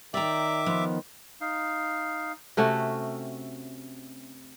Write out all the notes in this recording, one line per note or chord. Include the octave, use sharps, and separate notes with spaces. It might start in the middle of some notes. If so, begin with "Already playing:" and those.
D#3 D5 E5 G5 A#5 D6
F3 B3
D#4 F5
C3 A3 C#4 F#4